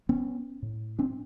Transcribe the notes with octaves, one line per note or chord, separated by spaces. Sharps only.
B3 C#4
A2
C4 D4